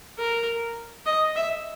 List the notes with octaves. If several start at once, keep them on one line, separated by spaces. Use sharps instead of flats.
A#4
D#5
E5